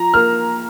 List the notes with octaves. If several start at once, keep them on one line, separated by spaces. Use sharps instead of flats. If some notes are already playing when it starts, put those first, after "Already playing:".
Already playing: F3 A#5
A#3 F6